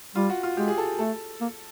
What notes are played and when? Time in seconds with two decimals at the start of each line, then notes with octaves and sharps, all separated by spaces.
0.15 G3 F4
0.29 F#4
0.43 F4
0.57 G#3 G4
0.68 G#4
0.78 A4
0.99 A3 A4
1.41 A#3